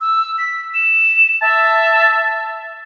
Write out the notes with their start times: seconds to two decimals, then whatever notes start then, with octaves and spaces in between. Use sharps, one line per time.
0.01 E6
0.38 B6
0.74 E7
1.42 E5 A5